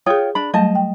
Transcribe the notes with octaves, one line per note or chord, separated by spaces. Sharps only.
F4 G#4 C#5 G5 D#6
D4 B5
F#3 G3 A3 D#5 A5
G5